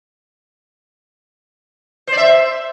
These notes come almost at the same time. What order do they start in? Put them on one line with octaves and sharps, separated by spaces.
C5 D5 E5